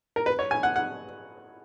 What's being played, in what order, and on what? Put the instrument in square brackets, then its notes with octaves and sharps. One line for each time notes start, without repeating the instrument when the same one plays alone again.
[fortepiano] A#4
B4
C#5
G#5
F#5
F#5